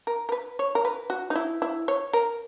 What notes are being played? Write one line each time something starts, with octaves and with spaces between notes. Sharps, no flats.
A#4
A#4
B4
C#5
A#4
B4
F#4
D#4
E4
E4
C#5
A#4